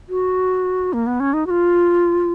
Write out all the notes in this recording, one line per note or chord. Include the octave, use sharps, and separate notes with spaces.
F#4
A#3
B3
C#4
D#4
F#4
F4